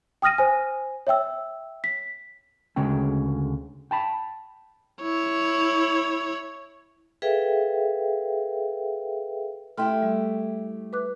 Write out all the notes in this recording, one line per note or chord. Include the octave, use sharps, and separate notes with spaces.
G5 D#6 F6 A#6 D#7
C5 G#5
C#5 E5 G5 E6
B6
D2 C#3 G#3 C#4 G5
G5 A5 B5
E4 C#5
G#4 A4 B4 E5 F5 G5
A3 E4 G4 G5 C6 F6
G3
B4 D6 F#6